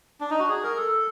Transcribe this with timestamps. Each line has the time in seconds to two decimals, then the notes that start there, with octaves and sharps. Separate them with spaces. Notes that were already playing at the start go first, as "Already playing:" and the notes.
0.20 D4
0.30 D#4
0.39 F#4
0.49 G#4
0.63 A#4
0.77 A4